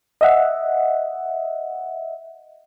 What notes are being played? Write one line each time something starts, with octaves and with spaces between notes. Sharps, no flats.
D#5 E5 F#5